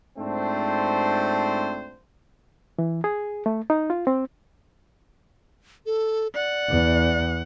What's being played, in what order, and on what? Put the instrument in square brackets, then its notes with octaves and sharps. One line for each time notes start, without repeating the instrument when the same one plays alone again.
[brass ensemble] G#2 A3 C4 D4 F4 C5
[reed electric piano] E3
G#4
A3
D#4
F4
C4
[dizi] A4
[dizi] D5 [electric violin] F#5
[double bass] E2